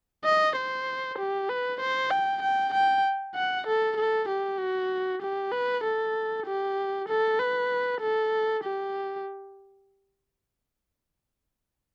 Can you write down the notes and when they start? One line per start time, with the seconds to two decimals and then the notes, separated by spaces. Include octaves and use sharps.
0.25 D#5
0.56 C5
1.18 G4
1.49 B4
1.80 C5
2.11 G5
2.42 G5
2.73 G5
3.35 F#5
3.67 A4
3.97 A4
4.28 G4
4.59 F#4
5.22 G4
5.52 B4
5.84 A4
6.46 G4
7.08 A4
7.39 B4
8.01 A4
8.63 G4